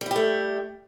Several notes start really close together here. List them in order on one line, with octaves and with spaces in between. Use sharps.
G3 E4 G4 A3